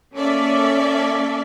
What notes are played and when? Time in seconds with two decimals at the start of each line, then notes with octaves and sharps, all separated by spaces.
0.15 A#3 C#4 A4 D5 E5